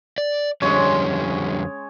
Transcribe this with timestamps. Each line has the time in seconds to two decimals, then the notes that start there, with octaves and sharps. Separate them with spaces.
0.18 D5
0.62 F2 D3 G3 G#3 C#4 C#5